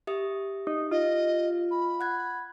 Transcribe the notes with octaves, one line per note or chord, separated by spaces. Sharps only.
G4 E5 D#6
D#4
F4 D#5
B5
F#5 F#6 G#6